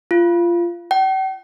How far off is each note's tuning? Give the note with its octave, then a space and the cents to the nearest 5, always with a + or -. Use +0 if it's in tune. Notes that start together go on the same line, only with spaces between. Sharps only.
F4 -20
G5 -45